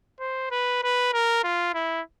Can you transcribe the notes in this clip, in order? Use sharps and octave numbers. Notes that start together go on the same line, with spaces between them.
C5
B4
B4
A#4
F4
E4